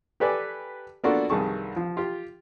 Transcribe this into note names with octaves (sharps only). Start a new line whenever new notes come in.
G4 A4 B4 D5 G#5
A#3 B3 D4 F4 F#4 A4
C2 G2 D#3 G#4 A5 C#6
F3
F4 G4